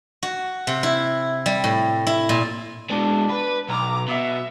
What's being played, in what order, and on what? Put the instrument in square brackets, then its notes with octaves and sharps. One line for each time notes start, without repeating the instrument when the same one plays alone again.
[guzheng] F#4
C3
E4
G3
A2
E4
A#2
[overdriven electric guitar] B2 G#3 [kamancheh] D4
[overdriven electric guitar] B4
[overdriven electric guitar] B1 [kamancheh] A#5 D6
[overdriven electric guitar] B2 [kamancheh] E5